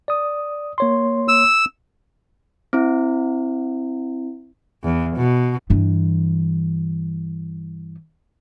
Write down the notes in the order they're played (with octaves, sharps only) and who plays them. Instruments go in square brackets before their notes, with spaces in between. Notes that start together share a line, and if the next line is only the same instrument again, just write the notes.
[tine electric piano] D5 D#6
A#3 C#5 C6
[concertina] E6
[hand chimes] C4 E4
[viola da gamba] E2
B2
[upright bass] G2 E3